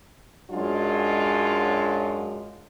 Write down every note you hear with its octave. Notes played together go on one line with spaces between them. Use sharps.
F#2 F#3 G#3 D4 F4